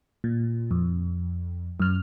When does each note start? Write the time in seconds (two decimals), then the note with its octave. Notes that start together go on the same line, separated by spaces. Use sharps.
0.24 A#2
0.71 F2
1.80 F#2 F6